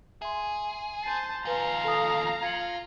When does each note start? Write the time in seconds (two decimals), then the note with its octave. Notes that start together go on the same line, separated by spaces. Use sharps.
0.22 G#4 E5 C6
1.04 C5 A5 C7 D#7
1.45 D#2 F3 B4 F5 G#5 A#5
1.84 A4 A5 D#6
2.42 F4 G#6 C#7 F#7